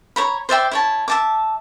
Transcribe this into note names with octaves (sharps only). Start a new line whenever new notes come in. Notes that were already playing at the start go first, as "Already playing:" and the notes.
C#5 A#5 B5
C5 D5 E5 G5
E4 C#5 A5
E5 A5 D6